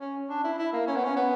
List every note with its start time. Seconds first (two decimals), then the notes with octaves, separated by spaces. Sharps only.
0.01 C#4
0.29 D4
0.44 E4
0.58 E4
0.73 A#3
0.87 C#4
0.96 B3
1.04 C#4
1.16 B3